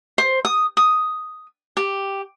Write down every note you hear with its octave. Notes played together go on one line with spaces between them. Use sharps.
C5
D#6
D#6
G4